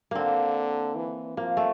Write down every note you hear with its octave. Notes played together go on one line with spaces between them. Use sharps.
D3 A#3 C4
E3
F3 A#3
A3